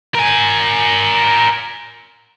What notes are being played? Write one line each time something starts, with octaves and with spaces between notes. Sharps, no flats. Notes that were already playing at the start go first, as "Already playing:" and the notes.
A#4 G#5